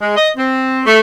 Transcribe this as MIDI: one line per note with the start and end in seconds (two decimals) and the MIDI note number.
0.01 0.15 56
0.17 0.29 75
0.37 0.82 60
0.86 1.00 57